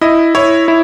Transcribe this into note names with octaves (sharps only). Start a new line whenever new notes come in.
E4 D#5
E4 C#5
E4